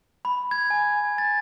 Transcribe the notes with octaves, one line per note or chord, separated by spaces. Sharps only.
B5
G#6
G#5
A6